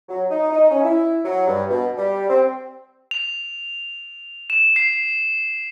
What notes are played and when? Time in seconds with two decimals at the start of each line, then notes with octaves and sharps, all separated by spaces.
0.09 F#3
0.31 D#4
0.51 D#4
0.71 C#4
0.83 E4
1.25 F#3
1.47 G2
1.70 B2
1.98 G3
2.29 C4
3.11 F7
4.50 E7
4.76 C7